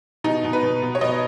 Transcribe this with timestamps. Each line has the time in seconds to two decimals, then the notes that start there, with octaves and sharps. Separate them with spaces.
0.24 B2 D#4
0.44 B2
0.53 B4
0.63 B2
0.82 B2
0.95 C#5
1.01 B2 D#5